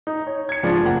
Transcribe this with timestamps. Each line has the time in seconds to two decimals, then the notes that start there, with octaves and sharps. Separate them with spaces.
0.07 D#4
0.27 C#5
0.49 G#6 C#7
0.63 G#2 C#3 F3 G3 D4 F4
0.82 F#1 A#3 F#5